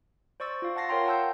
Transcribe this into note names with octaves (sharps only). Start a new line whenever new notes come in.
C5 D5 C#6 E6 A6
F4 F5
F#5 A5 A6 A#6 C7
A#4 C#5 F5 G5 A#5 C6
F#5 G5 A5 E6 G6